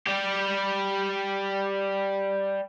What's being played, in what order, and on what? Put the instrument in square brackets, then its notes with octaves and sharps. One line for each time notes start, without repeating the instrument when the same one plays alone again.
[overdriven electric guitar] G3 G4